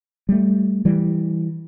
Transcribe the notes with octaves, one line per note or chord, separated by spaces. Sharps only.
G3 A3
E3 G3